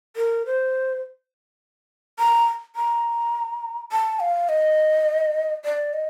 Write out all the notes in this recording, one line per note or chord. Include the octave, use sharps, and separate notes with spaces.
A#4
C5
A#5
A#5
A5
F5
D#5
D5
D#5